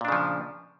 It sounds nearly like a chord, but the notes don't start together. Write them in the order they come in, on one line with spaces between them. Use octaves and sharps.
A#2 D4 C#3 F3